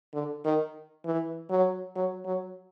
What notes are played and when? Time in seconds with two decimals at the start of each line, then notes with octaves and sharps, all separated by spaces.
0.14 D3
0.45 D#3
1.05 E3
1.50 F#3
1.95 F#3
2.25 F#3